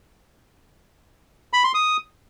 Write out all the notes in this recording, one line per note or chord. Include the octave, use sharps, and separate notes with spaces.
B5
C6
D#6